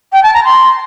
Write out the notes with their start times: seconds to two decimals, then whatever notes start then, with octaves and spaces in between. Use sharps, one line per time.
0.13 G5
0.23 A5
0.34 A#5
0.44 C6